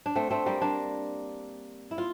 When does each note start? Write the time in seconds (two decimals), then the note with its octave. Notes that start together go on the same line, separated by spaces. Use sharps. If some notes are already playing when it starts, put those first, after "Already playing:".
0.06 D4
0.16 A3 C4
0.30 A3 C4
0.46 G3 A#3
0.61 A#3 D4
1.91 E4
1.98 F4